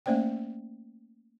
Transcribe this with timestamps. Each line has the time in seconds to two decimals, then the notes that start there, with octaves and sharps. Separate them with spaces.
0.06 A3 A#3 C#4 C5 D5 G5